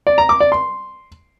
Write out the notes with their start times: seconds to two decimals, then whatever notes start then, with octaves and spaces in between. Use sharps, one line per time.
0.07 D5
0.18 A#5
0.29 D6
0.40 D5
0.52 C6